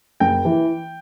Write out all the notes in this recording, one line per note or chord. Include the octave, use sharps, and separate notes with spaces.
F#1 G5
E3